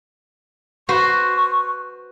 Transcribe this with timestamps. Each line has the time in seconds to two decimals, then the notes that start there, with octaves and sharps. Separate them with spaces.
0.89 F#4 B4 C5 C#6